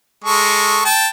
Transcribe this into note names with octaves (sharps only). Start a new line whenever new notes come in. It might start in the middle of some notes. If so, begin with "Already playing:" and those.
G#3 A4 C#6
G5 A5